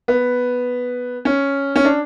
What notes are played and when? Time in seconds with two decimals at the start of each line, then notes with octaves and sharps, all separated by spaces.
0.08 B3
1.25 C#4
1.76 C#4
1.85 D4